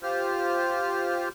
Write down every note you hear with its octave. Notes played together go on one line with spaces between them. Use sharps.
F4 G4 C5 F6